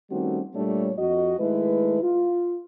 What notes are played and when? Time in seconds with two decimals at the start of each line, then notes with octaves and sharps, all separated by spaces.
0.10 D#3 G3 A3 C4 C#4 F#4
0.55 A#2 G3 A3 D4 C#5
0.98 F2 F#4 D#5
1.39 D#3 G#3 A3 E4 B4
2.02 F4